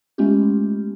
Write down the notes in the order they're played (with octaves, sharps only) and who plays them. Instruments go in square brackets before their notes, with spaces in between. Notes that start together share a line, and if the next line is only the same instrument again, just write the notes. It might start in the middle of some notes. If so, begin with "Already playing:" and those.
[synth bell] G#3 A3 B3 C#4 F4 G4